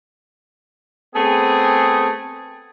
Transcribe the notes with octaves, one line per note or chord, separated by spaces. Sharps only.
A3 B3 C4 G#4